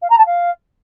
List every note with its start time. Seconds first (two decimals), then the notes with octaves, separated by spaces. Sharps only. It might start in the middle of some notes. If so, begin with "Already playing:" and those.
0.02 F5
0.10 A#5
0.18 A5
0.26 F5